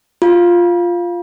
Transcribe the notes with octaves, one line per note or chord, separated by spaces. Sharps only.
F4